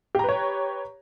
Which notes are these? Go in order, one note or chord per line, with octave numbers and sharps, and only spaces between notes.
G4 B4 C#5 A#5